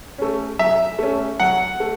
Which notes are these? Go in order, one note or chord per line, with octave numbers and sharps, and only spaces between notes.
A3 C#4
F#3 E5
A3 C#4
F#3 F#5
A3